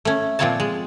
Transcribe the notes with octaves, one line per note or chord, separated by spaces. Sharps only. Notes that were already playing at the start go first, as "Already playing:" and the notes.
A3 C#4
A#2 F3 C4 F4 C#5 A5
G#3